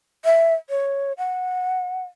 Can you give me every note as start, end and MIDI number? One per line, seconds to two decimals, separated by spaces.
0.25 0.54 76
0.70 1.13 73
1.18 2.03 78